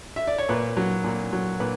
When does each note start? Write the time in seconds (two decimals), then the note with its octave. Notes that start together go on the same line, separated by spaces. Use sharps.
0.16 E5
0.27 D5
0.38 C#5
0.49 A#2 B4
0.77 F#3
1.04 A#2
1.32 F#3
1.60 A#2 B4